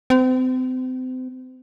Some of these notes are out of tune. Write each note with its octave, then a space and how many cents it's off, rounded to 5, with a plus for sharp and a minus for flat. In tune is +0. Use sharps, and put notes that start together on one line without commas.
C4 -35